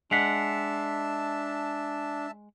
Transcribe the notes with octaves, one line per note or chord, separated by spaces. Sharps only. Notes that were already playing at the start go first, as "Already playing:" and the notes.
G#3 D4 E5 F#5 A5 B6 C7 F7